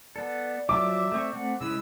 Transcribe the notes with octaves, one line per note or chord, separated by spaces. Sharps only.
B3 A4 D5
F3 F#3 E5 D6
A3 C4 C#6
A3 C4 F#5
C#3 G#3 E4 B4 E6